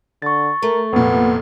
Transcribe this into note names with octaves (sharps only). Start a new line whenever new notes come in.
D3 C#6 A6
A3 A#4
F1 A#2 B3